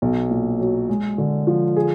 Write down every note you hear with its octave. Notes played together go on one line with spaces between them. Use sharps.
B1
A#2
F#3
G#3
D3
F3
G#4